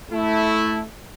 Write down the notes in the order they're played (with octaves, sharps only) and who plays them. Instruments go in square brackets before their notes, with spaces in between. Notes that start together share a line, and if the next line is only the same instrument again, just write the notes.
[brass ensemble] A3 E4